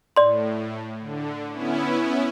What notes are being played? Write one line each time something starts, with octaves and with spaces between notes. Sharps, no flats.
A2 D5 C6
D3
B3 C#4 E4